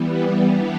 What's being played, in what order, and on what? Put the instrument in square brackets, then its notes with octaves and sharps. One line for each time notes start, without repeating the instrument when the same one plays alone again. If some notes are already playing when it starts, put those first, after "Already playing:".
Already playing: [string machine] E3 G3 B3
E3 G3 B3 D4 G4